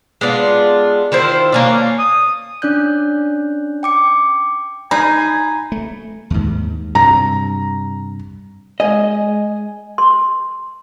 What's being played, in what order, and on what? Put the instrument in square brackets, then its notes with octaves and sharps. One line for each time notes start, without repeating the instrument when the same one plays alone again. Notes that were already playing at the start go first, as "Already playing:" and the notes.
[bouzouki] G#3 B3 D4 F4
D#3 E4 F4 C5
A#3 C#4 D4
[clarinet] D#6
[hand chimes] C#4 D4 D5 F#6 G6
G5 D6 C#7
[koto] D#4 [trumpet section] G#5 [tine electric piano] A#5 [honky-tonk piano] B5 C7
[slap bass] A3
D#2 G#2
[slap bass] G2 C3 [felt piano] A#5
[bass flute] G#3 [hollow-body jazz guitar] D#5 [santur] G#5
[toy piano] C6